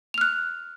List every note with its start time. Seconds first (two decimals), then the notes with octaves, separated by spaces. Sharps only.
0.14 F7
0.18 F6
0.21 F#6